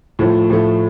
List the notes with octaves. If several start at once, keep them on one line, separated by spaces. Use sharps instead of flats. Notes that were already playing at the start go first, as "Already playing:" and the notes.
A2 F3 A3
A2 F3 A3